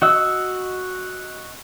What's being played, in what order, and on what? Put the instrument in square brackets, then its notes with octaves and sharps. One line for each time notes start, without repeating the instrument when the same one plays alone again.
[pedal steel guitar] F#4 D#5 E6